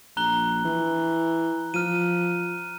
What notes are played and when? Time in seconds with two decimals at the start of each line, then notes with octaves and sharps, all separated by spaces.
0.17 A#1 A#5 F#6 G7
0.65 E3
1.74 F3 F6 D#7